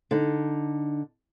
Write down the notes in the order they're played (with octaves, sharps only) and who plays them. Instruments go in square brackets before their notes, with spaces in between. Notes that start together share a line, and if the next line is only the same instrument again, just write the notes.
[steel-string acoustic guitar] D3 D#4